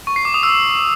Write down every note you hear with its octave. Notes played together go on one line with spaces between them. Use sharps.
C#6
C7
D6
D#6
E6